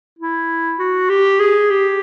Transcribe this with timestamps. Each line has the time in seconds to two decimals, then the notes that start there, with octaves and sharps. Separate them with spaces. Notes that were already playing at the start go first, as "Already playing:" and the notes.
0.19 E4
0.79 F#4
1.10 G4
1.40 G#4
1.70 G4